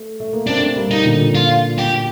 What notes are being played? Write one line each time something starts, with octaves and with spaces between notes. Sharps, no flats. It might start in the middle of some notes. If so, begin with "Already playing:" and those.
Already playing: A3
A3
A#3
A3 C4 D4
G3 A#3
D#4
A#2 D3
F4
G4